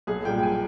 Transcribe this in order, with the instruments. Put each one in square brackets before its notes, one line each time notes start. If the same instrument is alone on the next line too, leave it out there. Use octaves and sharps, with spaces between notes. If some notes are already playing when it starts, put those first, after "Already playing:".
[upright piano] B1 G#4
A#2 G3 G5
G#5